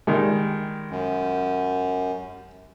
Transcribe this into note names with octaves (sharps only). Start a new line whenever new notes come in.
D#3 G3 G#3
F#2